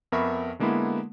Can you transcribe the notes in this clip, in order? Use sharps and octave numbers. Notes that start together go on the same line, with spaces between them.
F2 B3 A#4 E5 B5 C#6
D3 G#3 A#3 B3 E4